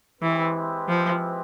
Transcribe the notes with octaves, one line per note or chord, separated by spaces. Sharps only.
E3 G#3 C4 E4 G4 B4
F3